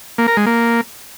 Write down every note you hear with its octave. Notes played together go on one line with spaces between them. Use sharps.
A#3
A#4
G#3
A#3